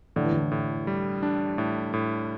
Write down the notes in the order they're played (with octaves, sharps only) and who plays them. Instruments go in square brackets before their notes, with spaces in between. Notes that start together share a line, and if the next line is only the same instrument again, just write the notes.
[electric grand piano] A2 [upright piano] D3
[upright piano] E3
D3
[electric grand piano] A2
G3
D4
A2
A2